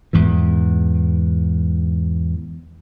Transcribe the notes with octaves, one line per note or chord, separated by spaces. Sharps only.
E2 G#2 E3